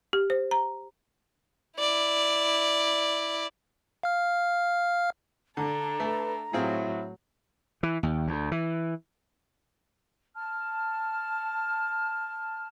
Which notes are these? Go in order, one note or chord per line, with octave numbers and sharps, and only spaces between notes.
G4
C5
A#5
E4 D5
F5 F6
D3 D4 A4 A#5
A3 B4
A2 F#3 C4 E4 F4 G#4
E3
D#2
D2
E3
A5 F6